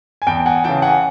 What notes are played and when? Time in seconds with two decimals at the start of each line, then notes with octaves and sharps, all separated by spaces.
0.22 G#5
0.27 E2 G5 A5
0.46 F#5 G#5
0.64 C#3 E3 G5 A5
0.82 F#5 G#5